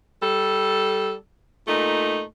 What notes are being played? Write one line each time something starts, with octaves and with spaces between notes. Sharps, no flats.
G3 A4
A#2 A3 D#4